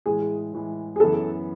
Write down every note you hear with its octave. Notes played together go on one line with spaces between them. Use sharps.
A2 E3 G#3 G#4
A2 E3 G#3
G#4
F#2 E3 B3 A4